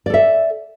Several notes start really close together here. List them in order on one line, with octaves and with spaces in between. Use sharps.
D5 A4 E5